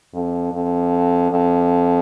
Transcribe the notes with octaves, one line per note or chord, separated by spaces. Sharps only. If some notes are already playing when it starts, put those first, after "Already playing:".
F2
F2
F2